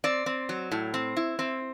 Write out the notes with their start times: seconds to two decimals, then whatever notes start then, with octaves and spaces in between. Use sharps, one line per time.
0.04 C4 D5
0.26 C4
0.49 F#3
0.71 A2
0.94 C4
1.17 E4
1.39 C4